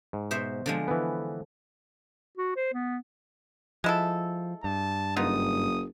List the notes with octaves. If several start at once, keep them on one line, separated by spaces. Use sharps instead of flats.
G#2
B2 C5 E5
D3 F3 G#3
E3 B3
F#4
C5
B3
F3 G#3 E4 A4
G2 A5
F#1 B3 D#4 F4 D#6